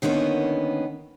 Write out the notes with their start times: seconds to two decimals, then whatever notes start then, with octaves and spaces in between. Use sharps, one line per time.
0.02 D3 D#3 A#3 B3 C#4